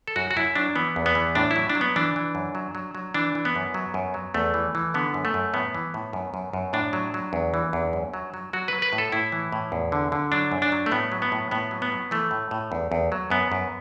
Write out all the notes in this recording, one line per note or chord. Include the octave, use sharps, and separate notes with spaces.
A4
F#2 F#4
F#4
F#2 E4
F#3 D4
E3 B3
E2
B3
E3
A2 D4
E4
F#3
D4
F#3
B3
E3 D4
E3
F#2
F#3
F#3
F#3
E3 D4
E3
B3
F#2
F#3
F#2
F#3
E2 A3
E3
E3
D3 B3
F#2
A3
F#2
A2 B3
E3
A2
F#2
F#2
F#2
A2 D4
F#3
F#3
E2
E3
E2
F#2
F#3
F#3
F#3 F#4
F#3 B4
B4
A2
A4
A2 E4
E3
A2
E2
D3
D3
F#3 D4
F#2
D4
F#3
A3
A2 B3
F#3
B3
A2
A2 B3
F#3
B3
F#3
E3 A3
A2
A2
E2
E2
F#3
F#2 B3
F#2